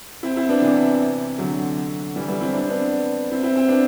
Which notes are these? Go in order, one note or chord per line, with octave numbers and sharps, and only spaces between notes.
C4 E4
C4 E4
B3 D4
C3 E3
D3 F#3
E3 G3
G3 B3
C4 E4
D4
C4
B3 D4
C4 E4
C4 E4
C4 E4
B3 D4